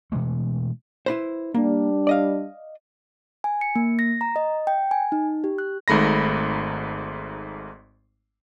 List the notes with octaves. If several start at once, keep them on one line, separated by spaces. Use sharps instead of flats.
B2 E3 G#3 A3
E4 B4 C5
G3 A#3 D4
D5 D#5 F5
G#5
C#7
A#3
A#6
A#5
D#5
G5
G#5
D#4
G4
F#6
G#1 G#2 A3 B5 A#6